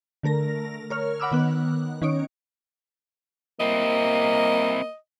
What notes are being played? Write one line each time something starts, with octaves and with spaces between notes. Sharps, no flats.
D3 A3 A#4 A#6
A#4 C#5 F6
F#5 B5 D6 E6 F6
D#3 B3 F#6
D#3 C#4 D#4 C#5 D7
A#3 C4 E4 D#5